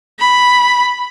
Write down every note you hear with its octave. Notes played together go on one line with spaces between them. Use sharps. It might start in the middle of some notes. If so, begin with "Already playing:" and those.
B5